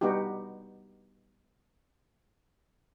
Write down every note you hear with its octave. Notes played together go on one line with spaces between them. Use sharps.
G3 B3 D#4 F#4 G4